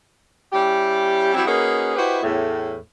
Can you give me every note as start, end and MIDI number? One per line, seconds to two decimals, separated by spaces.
0.53 1.31 55
0.53 1.31 61
0.53 1.31 64
0.53 1.31 67
1.34 1.43 54
1.34 1.43 55
1.34 1.43 60
1.34 1.43 64
1.46 1.93 58
1.46 1.93 61
1.46 1.93 63
1.46 1.93 66
1.46 1.93 68
1.46 1.93 71
1.96 2.18 64
1.96 2.18 66
1.96 2.18 67
1.96 2.18 71
1.96 2.18 72
1.96 2.18 75
2.23 2.76 40
2.23 2.76 45